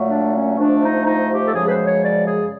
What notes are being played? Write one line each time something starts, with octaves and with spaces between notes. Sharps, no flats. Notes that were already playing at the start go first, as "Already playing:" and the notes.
Already playing: A#2 F#3 A3
D4
C#4
G#2 F3 A3 D4
D#4
D#4
G4
A4
F#2 C#3 F3 G#3 G#4
B4
C5
C#5
D5
G#4